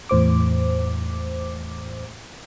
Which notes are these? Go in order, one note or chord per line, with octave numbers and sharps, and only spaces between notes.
E2 A2 C5 D6